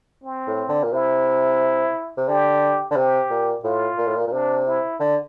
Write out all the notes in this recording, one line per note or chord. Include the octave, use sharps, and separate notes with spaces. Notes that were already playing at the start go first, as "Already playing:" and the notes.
C4
A2
D3
A#2
C3 E4
C3
D3 G4
D3
C3 G4
A#2
A2 F4
A#2
A2
A#2
A#2
C3 D4
E4
D3